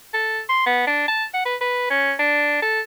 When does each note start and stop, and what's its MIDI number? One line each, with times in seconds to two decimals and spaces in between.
0.14 0.41 69
0.49 0.66 84
0.66 0.86 59
0.87 1.03 62
1.08 1.24 81
1.34 1.43 78
1.45 1.56 71
1.61 1.87 71
1.90 2.14 61
2.19 2.59 62
2.62 2.81 69